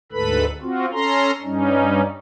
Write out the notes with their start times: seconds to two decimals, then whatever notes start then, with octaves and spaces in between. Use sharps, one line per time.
0.12 D2 G#2 A4 B4 B5
0.62 C4 F4 F#4
0.92 C#4 A4 A#5 C6
1.42 G2 G3 C#4 D#4